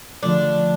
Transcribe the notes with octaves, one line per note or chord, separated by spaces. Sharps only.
D3 F3 A3 D4